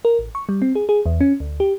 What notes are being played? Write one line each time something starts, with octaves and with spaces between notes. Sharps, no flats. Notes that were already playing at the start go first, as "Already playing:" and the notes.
A#4
A1
C#6
G3
C4
G#4
G#4
E2
C#4
D2
G4